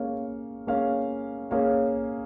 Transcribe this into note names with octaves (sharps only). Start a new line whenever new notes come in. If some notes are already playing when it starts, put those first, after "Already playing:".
Already playing: A#3 C#4 G#4 C#5 F5
A#3 C#4 G#4 C#5 F5
A#3 C#4 G#4 C#5 F5